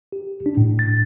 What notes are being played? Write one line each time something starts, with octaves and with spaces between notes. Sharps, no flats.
G4
D4
A2
A6